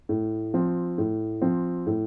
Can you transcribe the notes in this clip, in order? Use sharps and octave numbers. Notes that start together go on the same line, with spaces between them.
A2
F3 C4
A2
F3 C4
A2